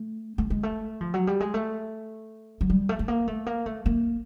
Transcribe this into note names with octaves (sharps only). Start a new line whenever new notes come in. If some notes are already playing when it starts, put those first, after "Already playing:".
Already playing: A3
A3
G#3
A3
F3
F#3
G3
G#3
A3
F#3
G3
A3
A3
A#3
A3
A#3
A3
A#3